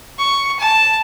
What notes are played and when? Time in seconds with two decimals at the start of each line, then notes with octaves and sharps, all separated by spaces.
0.18 C#6
0.59 A5